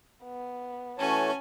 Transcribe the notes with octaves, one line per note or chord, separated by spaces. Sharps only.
B3
E3 A3 C#4 F#4 C#5 G#5 A5